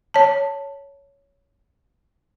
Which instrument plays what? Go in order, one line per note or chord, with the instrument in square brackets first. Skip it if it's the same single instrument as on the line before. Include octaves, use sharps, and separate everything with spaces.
[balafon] C#5 A5